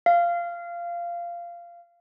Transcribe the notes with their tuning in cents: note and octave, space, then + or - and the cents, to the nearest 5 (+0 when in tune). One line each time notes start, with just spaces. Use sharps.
F5 -15